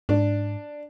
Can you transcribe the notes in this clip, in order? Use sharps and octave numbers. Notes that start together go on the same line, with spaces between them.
G#2 D4